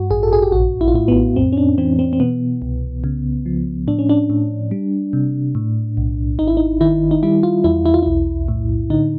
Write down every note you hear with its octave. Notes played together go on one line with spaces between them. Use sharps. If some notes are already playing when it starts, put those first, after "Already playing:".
Already playing: G2 F#4
A1 G#4
A4
G#4
G4
A#1 F#4
E4
F4
A2 E4
B3
F2 C4
C#4
D4
E3 C4
C4
C4
B2 B3
C2
C#3
F3
A2 D4
C#4
D4
A2
G3
C3
A2
B1
G#1 D#4
E4
D#4
D#3 E4
D#4
G3 E4
F4
E2 E4
E4
F4
B1 E4
A2
D3 D#4